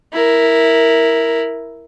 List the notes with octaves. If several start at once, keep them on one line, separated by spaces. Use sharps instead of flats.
E4 A#4